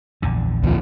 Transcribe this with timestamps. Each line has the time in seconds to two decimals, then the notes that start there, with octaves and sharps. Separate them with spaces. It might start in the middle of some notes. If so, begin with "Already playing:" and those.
0.22 A#1 E2 D3
0.63 D2 F3